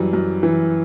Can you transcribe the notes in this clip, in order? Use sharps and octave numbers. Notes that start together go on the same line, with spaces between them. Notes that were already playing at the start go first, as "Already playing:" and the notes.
Already playing: F#2 E3 G3
F#2
E3